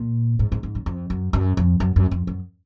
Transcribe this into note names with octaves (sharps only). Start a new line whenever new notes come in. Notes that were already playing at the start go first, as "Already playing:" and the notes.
Already playing: A#2
G#2
G#2
G#2
F#2
F2
F#2
F#2
F2
F#2
F#2
F2
F#2